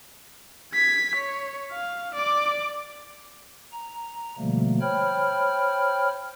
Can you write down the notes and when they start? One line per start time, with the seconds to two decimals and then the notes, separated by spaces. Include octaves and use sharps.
0.74 G#6 B6
1.16 C#5
1.72 F5
2.14 D5 D6
3.72 A#5
4.38 B2 D3 F3 G3 A3 A#3
4.81 C5 C#5 G5 B5 F6